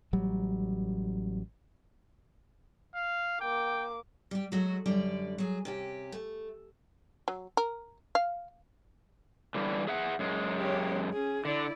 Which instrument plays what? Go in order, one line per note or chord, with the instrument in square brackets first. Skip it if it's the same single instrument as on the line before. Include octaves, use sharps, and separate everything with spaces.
[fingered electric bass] A1 F#3 G3
[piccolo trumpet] F5
[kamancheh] A#3 D6 [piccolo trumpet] G5
[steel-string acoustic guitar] G3 G4
F#3 G#3 A3 F#4
F#2 D3 G3 D5
F#3 G#4
C3 C#4 G4
A3
[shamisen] F#3
A#4
F5
[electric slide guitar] D3 E3 G3
G#4 E5 F#5
F#2 G#3
[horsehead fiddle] G4 C#5
C#4 G#4
[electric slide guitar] D3 [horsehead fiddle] E4 D5